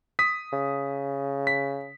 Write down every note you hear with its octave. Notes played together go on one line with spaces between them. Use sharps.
D#6 B6
C#3
B6